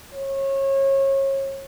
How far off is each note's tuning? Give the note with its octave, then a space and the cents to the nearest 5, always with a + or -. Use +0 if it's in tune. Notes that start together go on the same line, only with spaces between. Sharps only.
C#5 -30